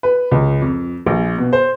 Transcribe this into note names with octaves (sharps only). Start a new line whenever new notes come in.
B4
C#2
F2
A#1
B2
C5